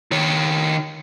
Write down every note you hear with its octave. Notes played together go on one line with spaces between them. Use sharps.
D#3 C#5